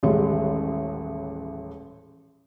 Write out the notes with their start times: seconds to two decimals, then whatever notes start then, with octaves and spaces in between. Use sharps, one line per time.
0.03 D#1 A1 G#3